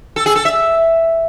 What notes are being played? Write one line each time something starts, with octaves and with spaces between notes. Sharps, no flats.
A4
G#4
A4
E5